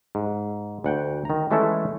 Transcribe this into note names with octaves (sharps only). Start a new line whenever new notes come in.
G#2
D2 F#5 G5
D#3 A#5
E3 G#3 A3 C#4 E4 A4